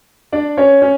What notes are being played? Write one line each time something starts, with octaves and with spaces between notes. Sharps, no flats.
D4 D5
C#4 C#5
C#4